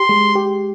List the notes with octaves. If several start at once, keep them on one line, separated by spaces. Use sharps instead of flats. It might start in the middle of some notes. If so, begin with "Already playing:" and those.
Already playing: G4 C6
G#3
G4